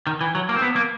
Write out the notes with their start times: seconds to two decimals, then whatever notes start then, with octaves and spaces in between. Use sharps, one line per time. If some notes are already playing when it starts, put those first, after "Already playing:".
0.07 D#3
0.21 E3
0.35 F#3
0.49 A#3
0.56 C4
0.62 B3
0.76 A#3